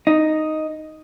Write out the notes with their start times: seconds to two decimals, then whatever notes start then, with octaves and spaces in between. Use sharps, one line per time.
0.07 D#4